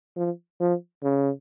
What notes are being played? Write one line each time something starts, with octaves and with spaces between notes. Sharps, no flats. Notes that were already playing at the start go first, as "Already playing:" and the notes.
F3
F3
C#3